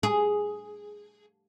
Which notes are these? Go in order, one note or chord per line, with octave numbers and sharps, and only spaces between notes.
G#4